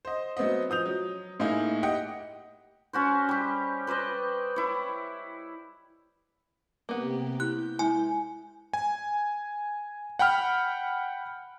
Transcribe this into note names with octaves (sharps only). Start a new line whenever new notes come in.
C5 D#5
F#3 A3 B3 C4 D#5
F3 D#6 G6 F7
F#3
A2 A#3 D#4 E4 G#4
G4 D#5 F#5 G5
C#4 F#4 C5
G3 G4
B4 C5 D5 D#5
E4 C#5
C3 A#3 B3 G4
E4 F#6 G6
G#3 E4 G#5
G#5
F#5 G5 B5 F6